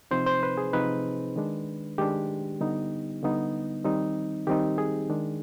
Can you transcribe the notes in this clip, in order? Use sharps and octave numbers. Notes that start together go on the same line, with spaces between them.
C3 F3 C4 D#4 C5
C5
B4
G#4
C3 F3 C4 D#4 B4
D#3 G#3 D4
D#3 G#3 D4 G4
D3 G3 B3 D#4
D3 G3 B3 D#4
D#3 G3 C4 D#4
D#3 G3 C4 D#4 G4
G#4
D#3 G#3 D4